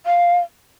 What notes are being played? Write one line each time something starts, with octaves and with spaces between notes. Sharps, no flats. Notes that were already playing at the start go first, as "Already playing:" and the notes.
F5